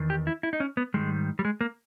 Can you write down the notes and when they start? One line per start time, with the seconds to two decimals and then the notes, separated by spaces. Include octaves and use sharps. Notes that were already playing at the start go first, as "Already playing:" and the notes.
Already playing: E2 D#3
0.10 G4
0.27 E4
0.43 E4
0.53 D#4
0.60 C#4
0.77 B3
0.94 G#2 D#3 G3 G#3
1.39 G3
1.45 G#3
1.61 A#3